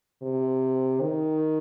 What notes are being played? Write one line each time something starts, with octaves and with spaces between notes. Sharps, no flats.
C3
D#3